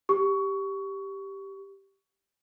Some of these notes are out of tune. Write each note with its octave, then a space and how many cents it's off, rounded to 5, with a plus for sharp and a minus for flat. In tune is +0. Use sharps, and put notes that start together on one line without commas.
G4 +0 C#6 +20